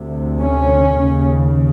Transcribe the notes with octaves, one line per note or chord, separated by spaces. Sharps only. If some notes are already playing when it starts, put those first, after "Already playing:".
Already playing: D2 C3
C#4
D#2 C#3